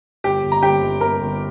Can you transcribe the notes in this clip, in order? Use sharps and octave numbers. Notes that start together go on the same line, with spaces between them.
G1 G4 G5
G1
A#5
G1 G4 G5
G1
G1 A#4 A#5
G1